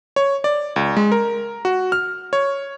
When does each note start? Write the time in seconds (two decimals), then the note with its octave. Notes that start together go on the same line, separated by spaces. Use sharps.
0.16 C#5
0.44 D5
0.76 C#2
0.97 G#3
1.12 A#4
1.65 F#4
1.92 F6
2.33 C#5